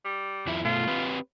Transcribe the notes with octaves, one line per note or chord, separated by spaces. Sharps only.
G3
F2 F3 E4
B2 A3 F4
C4 G4 B4